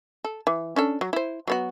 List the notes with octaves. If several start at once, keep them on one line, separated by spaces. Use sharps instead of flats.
A4
E3
C#4 D4 A4
F#3
E4 C5
F#3 B3 F#4